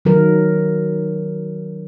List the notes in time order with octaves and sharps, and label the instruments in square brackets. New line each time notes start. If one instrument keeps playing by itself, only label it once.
[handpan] D#3 F#3 A#4